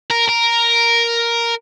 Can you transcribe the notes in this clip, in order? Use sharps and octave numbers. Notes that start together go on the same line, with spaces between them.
A#4
A#4